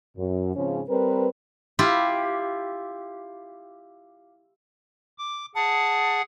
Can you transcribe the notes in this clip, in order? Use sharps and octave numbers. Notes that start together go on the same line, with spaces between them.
F#2
G#2 C#3 F3 C4 C#4
G3 C4 A#4 B4
E4 F4 G4
D6
G#4 F#5 A5